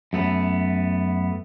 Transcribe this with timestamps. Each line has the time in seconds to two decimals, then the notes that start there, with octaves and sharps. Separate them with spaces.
0.13 F#2 A3 B3